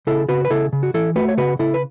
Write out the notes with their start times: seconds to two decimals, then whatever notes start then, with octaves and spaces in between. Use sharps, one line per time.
0.07 C#3 E4 A4
0.29 C#3 F#4 B4
0.45 B4
0.50 C#3 E4 A4
0.73 C#3
0.83 F#4
0.94 E3 E4 A4
1.16 A3 F#4 B4
1.29 C#5
1.37 C#3 F#4 B4
1.59 C#3 E4 A4
1.74 B4